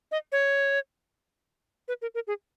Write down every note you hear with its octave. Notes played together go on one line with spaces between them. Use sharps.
D#5
C#5
B4
A#4
A#4
G#4